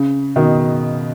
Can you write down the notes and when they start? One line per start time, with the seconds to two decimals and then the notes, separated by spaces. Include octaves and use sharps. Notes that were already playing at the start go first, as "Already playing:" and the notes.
Already playing: C#3
0.36 B2 D#3